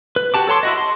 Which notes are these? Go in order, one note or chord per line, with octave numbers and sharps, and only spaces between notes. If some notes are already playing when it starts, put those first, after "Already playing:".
B4
F#4 G4 A5 D6
A4 C#5 A5 C6 D6
E4 F#4 D#5
C6